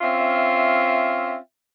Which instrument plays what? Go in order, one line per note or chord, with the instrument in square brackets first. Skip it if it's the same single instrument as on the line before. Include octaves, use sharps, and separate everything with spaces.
[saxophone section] C4 C#4 F4 E5